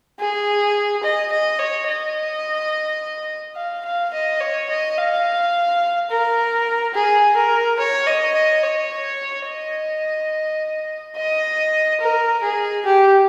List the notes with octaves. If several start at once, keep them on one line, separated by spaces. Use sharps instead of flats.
G#4
D#5
D#5
C#5
D#5
F5
F5
D#5
C#5
D#5
F5
A#4
G#4
A#4
C#5
D#5
D#5
C#5
D#5
D#5
A#4
G#4
G4